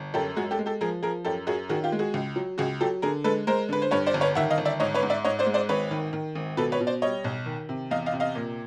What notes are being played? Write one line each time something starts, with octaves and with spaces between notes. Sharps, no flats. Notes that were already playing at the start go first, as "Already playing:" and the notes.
Already playing: G1
F#2 G4 A4
G#3 F#4 G#4
G4 A4
G#3
G4 A4
F3 G#4 A#4
F3 G#4 A#4
F#2 G4 A4
F#2 F#4 G#4
D#3 F#4 G#4
F4 G4
G#3
F#4 G#4
C#2
F#3
C#2 F#4 G#4
F#3 G4 A4
D3 G#4 A#4
G#3 A4 B4
G#3 A#4 C5
D3 B4
C5
G2 B4 C#5
C5 D5
G1
B4 C#5
D#3 E5 F#5
D#5 F5
G1
D5 E5
G#2 C#5 D#5
B4 C#5
G#2
D5 E5
G#2 C#5 D#5
C5 D5
G#3
C5 D5
G#1 B4 C#5
D#3
D#3
G#1
B2 A4 B4
B4 C#5
B2
C5 D5
G3 C#5 D#5
B1
D#3
C3
E2 D#5 F5
D#5 F5
C3
D#5 F5
A#2